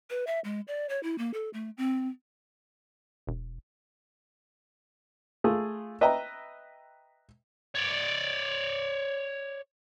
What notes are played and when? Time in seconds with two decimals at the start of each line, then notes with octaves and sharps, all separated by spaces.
0.10 B4
0.27 E5
0.44 G#3
0.68 D5
0.89 C#5
1.03 E4
1.18 A#3
1.34 A4
1.53 A3
1.77 C4
3.27 E1
5.44 A3 F4 G#4
6.01 B4 D#5 E5 G5 A#5
7.75 C#5 D5